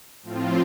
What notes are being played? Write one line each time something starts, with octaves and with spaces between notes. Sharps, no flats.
A2 F3 C4 F4